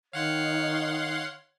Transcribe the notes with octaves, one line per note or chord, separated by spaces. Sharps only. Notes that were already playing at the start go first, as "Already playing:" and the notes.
D#3 C#5 F5 F#5 C6